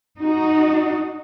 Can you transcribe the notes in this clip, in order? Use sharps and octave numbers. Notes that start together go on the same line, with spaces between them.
D#4 F#4